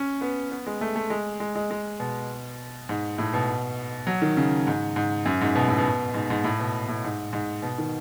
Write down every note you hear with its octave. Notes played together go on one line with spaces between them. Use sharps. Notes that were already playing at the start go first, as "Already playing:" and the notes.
Already playing: C#4
B3
B3
G#3
A3
A3
G#3
G#3
G#3
G#3
B2
G#2
A2
B2
F#3
D#3
C#3
G#2
G#2
F#2
G#2
B2
A2
B2
G#2
G#2
A2
B2
A2
G#2
G#2
B2
D#3